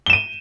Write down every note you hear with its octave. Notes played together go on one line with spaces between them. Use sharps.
D#7 E7 G7